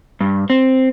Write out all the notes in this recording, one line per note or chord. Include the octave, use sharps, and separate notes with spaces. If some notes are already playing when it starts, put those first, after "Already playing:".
G2
C4